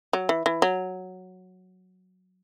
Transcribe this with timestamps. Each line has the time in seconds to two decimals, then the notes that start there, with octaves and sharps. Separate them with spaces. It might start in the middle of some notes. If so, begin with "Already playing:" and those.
0.13 F#3
0.29 E3
0.46 E3
0.62 F#3